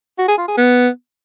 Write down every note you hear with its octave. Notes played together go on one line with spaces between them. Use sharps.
F#4
G#4
F4
G#4
B3